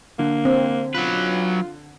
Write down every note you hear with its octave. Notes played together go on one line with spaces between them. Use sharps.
D3 A#3
C4
F#3 F4 B4